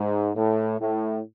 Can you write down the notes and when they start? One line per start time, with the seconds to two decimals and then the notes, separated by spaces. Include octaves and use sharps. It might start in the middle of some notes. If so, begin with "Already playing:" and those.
Already playing: G#2
0.36 A2
0.81 A2